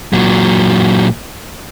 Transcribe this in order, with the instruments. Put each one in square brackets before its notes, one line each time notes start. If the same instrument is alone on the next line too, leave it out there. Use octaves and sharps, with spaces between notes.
[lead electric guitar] A#2 F#3